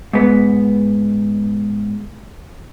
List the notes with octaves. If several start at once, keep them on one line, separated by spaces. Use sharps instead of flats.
G#2 B3